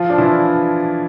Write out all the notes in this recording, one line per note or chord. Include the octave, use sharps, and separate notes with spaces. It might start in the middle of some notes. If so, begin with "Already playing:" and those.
Already playing: F3 F4
D4
E3 E4